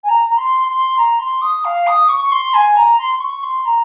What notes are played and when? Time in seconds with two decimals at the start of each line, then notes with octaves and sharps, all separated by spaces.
0.04 G#5
0.09 A#5
0.28 A#5
0.38 C6
0.68 C6
0.97 A#5
1.19 C6
1.42 D#6
1.65 F5
1.87 D#6
2.09 C#6
2.23 C#6
2.32 C6
2.54 G#5
2.76 A#5
2.99 C6
3.17 C6
3.20 C#6
3.43 C6
3.65 A#5